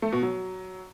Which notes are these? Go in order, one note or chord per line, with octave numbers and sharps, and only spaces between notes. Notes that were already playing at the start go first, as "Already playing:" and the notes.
A3
B2
F#3